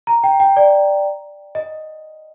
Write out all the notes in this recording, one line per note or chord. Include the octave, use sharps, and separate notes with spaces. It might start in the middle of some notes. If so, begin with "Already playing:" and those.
A#5
G5
G5
D5
D#5